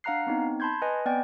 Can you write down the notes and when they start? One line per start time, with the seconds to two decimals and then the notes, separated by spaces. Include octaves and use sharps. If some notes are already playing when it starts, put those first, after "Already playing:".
0.04 D4 F5 F#5 A#5 F#6 C7
0.27 B3 C4 D#4
0.60 A5 B5 C6 G6 G#6
0.82 B4 D#5 G#5
1.06 B3 C4 D5 G5 G#5